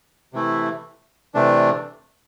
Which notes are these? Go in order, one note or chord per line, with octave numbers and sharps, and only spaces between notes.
C3 E3 A3 E4
C3 E3 A3 D4